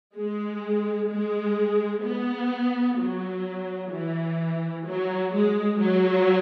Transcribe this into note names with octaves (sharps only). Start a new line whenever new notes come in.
G#3
G#3
B3
F#3
E3
F#3
G#3
F#3